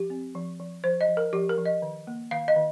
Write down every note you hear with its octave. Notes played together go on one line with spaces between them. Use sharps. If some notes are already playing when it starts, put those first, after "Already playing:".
Already playing: F3 G4
C4
F3
F3
F3 C5
D#5
F3
A#4
F3 G4
A#4
F3
D#5
D#3
A#3
D#3 F5
D#5
D#3